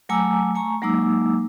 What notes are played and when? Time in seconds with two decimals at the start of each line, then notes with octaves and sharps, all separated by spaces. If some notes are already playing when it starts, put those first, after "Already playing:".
0.09 F#3 A3 G#5 A#5 D6 E6
0.55 A3 G#5 A#5 C#6
0.82 F#3 G#3 A#3 D#4 D6 E6